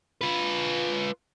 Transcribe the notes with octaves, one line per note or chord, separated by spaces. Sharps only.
F4 B4